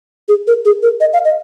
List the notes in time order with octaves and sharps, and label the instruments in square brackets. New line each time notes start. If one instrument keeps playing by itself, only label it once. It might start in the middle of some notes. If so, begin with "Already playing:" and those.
[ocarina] G#4
A#4
G#4
A#4
D#5
F5
D#5